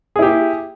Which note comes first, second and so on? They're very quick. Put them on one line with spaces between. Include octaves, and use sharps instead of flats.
G#4 E4 G4